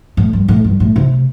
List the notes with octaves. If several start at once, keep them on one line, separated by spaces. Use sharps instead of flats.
A2
G2
A2
G2
A2
C3